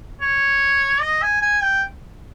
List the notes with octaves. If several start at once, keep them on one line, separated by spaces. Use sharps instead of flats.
C#5
D#5
G#5
G#5
G5